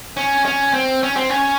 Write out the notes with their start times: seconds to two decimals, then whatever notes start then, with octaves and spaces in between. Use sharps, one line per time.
0.17 C#4
0.45 C#4
0.74 C4
1.03 C#4
1.16 C4
1.30 C#4